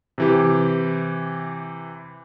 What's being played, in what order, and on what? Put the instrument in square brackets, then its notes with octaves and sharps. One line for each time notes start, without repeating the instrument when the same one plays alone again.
[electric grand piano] C3 E3 G4